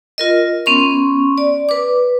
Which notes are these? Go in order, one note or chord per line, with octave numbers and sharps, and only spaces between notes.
F4 A#4 D#5
B3 C#4 C6 C#6
D5
B4 D6